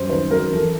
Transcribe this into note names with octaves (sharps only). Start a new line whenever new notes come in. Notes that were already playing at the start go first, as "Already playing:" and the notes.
Already playing: F#2 G3 C5
D#3 B4
F#3 A#4
E3 A4